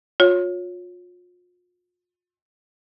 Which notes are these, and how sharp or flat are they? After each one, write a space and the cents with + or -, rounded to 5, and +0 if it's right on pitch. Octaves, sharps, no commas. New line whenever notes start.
F4 +40 C#5 +0